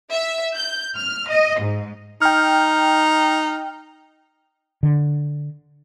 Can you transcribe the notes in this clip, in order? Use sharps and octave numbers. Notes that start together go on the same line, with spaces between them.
E5
G6
F6
D#5
G#2
D#4 G5 F6
D3